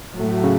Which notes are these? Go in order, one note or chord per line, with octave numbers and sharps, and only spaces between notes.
A2 F#3 A3
C#3